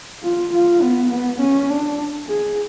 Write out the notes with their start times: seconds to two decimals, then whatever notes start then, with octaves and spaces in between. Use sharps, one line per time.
0.23 F4
0.53 F4
0.82 B3
1.11 B3
1.40 C#4
1.69 D4
2.28 G#4